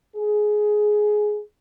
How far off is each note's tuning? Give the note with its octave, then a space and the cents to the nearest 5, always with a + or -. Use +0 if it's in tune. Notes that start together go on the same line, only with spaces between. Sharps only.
G#4 +15